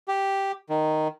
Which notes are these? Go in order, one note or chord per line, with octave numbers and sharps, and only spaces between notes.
G4
D#3